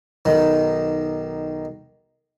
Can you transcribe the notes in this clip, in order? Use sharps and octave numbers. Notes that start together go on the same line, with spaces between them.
B1 D#3